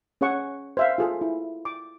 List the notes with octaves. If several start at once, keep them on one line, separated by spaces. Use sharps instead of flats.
C#4 G#4 C#5 F#5 C#6
C5 E5 F5
F4 G#4 A4
E4
D6